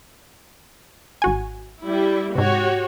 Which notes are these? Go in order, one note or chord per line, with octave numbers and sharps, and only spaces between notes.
G#1 F#4 G#5
G3 E4
G#2 C3 F#4 G4 C#5